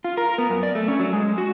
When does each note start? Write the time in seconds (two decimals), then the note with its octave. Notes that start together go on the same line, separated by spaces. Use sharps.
0.04 F4
0.17 A#4
0.38 B3
0.50 F#2
0.63 D5
0.75 A3
0.88 C#4
0.99 F#3
1.13 G#3
1.38 F#4